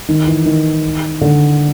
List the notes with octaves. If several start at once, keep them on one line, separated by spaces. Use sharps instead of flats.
D#3
E3
D#3
D3